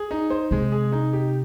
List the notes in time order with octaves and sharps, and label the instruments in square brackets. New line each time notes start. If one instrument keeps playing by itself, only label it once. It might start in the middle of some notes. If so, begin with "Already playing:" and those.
Already playing: [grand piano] G#4
D#4
C5
[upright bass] C3 [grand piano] G#3
[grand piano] G#4
D#4
G4